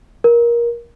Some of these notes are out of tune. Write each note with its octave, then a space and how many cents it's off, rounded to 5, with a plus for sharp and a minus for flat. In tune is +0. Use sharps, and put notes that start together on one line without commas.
A#4 +20